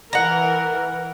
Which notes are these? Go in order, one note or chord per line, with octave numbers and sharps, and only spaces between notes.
E3 A#4 F#5 A#5